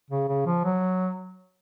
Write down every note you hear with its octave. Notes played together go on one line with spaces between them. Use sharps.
C#3
C#3
F3
F#3